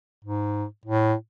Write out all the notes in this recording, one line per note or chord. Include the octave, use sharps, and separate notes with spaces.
G#2
A2